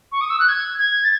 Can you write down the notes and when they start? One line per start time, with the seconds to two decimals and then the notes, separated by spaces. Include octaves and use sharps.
0.12 C#6
0.21 D#6
0.30 E6
0.40 F#6
0.49 G#6
0.79 G#6
1.04 A6